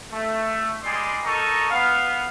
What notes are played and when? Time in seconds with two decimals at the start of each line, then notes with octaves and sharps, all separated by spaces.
0.12 A3
0.83 G3 G#3 G#4 D5 C6
1.25 D#4 A4 A#4 D#5 C#6
1.70 B3 F5